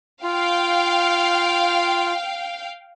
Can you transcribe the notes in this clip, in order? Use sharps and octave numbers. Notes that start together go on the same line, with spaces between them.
F4 F5 G5